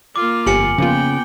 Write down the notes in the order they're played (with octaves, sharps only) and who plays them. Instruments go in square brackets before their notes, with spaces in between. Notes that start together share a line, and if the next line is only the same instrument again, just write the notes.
[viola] A#3 F4 [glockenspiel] D6
[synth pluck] G1 F2 G4 [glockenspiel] G#5 C#7 F#7
[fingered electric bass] C#3 [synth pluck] F3 A#3 F4 [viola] B3 G5